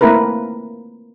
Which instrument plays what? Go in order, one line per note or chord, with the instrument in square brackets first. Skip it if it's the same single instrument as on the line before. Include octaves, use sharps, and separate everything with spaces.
[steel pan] A3 A#3 C4 E4 A#4 B4